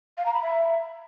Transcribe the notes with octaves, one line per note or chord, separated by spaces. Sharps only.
F5
A#5
B5
E5